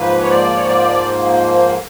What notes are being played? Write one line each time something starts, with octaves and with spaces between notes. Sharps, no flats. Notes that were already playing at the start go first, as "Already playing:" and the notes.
Already playing: G#2 F3 A#3 B4
C#5
D5
C#5
D5